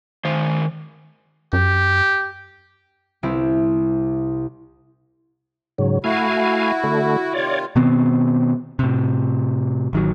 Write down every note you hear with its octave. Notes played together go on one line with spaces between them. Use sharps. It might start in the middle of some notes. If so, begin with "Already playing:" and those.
D#3 C5
F#2 G4
C2 C4 E4 G4
G#2 C#3 F#3
A3 E4 F#4 F5 G#5
D3 A3
C3 D#3 F4 C#5 D5
B2 D#3 B3 C4
A2 C3
A1 D#3 F#3